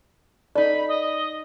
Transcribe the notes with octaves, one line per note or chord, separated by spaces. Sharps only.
D#4 A4 D5 B5
D#5